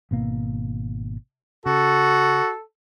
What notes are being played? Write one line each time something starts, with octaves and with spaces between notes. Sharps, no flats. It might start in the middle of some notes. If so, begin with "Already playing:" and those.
G#1 B2 A#3
C#3 F#4 A4